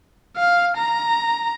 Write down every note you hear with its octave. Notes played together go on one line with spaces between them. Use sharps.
F5
A#5